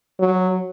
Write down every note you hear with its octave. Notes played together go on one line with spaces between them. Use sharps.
F#3